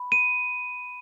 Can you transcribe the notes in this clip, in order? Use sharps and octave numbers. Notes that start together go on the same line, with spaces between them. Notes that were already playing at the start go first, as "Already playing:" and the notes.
Already playing: B5
D#7